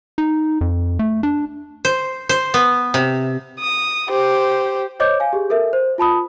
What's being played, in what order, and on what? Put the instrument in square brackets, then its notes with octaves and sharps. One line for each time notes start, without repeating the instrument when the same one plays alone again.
[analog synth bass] D#4
F2
A3
D4
[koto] C5
C5
B3
C3
[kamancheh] D#6
G4 C5
[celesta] C5 C#5 D#5 D6 G6
F5 G#5
G4 G#4
A4 A#4 E5
C5
F4 A5 B5 D#6